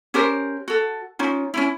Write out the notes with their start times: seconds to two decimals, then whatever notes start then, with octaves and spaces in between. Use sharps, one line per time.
0.14 C#4 G4 A#4 C5
0.68 F#4 A4
1.19 C#4 D#4 F4
1.54 C#4 D#4 E4